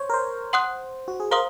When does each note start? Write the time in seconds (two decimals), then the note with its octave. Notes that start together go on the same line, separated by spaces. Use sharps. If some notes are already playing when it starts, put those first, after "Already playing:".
Already playing: C5 C#5
0.09 A#4
0.14 C5
0.53 F#5 C6 D#6 F#6
1.08 F#4
1.20 G#4
1.31 A#4 C5 F5 C6 D#6